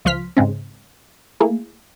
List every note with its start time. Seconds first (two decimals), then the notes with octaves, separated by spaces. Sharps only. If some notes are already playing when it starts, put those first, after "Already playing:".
0.05 C#2 F3 C6 F6 B6
0.37 G#2 C#3 G#3 C4
1.40 A3 A#3 E4 G#4